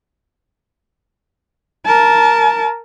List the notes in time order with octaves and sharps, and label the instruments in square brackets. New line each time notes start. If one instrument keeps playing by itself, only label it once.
[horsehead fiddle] A#4 A5